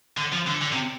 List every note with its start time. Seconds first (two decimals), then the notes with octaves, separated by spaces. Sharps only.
0.17 D3
0.33 F3
0.47 D3
0.62 D3
0.72 C3